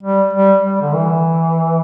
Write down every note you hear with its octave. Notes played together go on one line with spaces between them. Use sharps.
G3
G3
G3
D3
E3